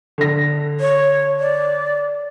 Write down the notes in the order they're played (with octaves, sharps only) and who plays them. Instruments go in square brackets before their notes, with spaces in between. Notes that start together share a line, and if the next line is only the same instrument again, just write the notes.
[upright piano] D3 A#6
[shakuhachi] C#5
D5